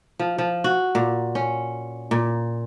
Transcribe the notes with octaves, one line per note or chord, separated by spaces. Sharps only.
F3
F3
F#4
A#2
C#4
A#2